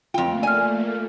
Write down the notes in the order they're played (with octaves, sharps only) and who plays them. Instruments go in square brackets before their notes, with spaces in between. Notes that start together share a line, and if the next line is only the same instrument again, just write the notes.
[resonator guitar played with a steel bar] F2 G5 [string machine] A3 A#3 [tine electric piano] F4
[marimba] D5 F6 [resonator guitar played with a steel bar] G#5